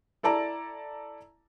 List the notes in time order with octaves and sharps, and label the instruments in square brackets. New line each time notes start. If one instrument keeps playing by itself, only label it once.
[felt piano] E4 A4 D5 A5 A#5